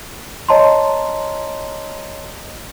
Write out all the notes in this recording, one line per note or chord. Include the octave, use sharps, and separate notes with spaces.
C#5 D#5 A5 A#5 C6